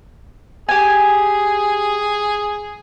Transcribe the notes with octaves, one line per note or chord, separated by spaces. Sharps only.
G4 G#4 G#5